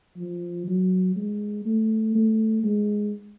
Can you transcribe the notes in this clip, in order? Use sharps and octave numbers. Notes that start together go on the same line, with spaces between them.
F3
F#3
G#3
A3
A3
G#3